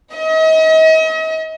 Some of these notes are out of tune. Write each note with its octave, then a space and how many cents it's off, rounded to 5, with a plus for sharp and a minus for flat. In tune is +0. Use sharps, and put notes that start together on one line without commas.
D#5 +40